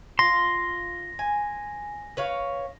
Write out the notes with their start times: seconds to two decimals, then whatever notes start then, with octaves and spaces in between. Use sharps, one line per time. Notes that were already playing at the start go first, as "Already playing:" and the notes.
0.19 F4 C6 A#6
1.19 G#5
2.17 B4 C#5 F5